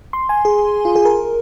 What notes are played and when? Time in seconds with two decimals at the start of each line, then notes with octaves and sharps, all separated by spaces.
0.13 C6
0.29 G#5
0.45 G#4
0.85 F4
0.95 G#4
1.05 A#4